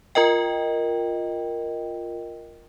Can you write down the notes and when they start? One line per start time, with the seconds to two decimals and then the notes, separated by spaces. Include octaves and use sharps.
0.15 F4 A#4 D#5 G5